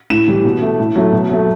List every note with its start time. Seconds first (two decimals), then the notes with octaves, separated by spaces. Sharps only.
0.10 A2 E7
0.28 E3 G3
0.45 B2
0.62 A3
0.79 A2
0.96 F#3 A3
1.12 B2
1.29 F#3 A3